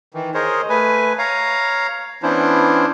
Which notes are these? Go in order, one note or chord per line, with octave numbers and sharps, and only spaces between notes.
D#3 E3
G#4 A#4 C5 C#5 D#5
A3 B4 G#5
C#5 F5 A#5
E3 B3 C#4 D4 E4 C5